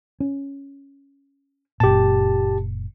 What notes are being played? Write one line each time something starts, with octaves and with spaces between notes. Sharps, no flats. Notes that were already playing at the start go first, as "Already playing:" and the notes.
C#4
F#1 A#2 G4 A5